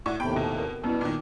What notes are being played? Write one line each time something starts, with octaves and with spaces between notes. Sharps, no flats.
A2 F#4 D5 C#6
D#2 A2 C3 B3 G5 B5
B2 C4
A#4
F#2 B2 G3 B3 E4
A#2 D#3